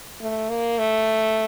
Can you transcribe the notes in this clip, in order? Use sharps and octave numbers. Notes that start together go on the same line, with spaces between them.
A3
A#3
A3